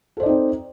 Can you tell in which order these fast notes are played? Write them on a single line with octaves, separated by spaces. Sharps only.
A4 C5 D5 D#4 C4